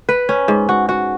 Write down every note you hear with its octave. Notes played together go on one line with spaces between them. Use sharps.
B4
C#4
G#2
F#4
F#4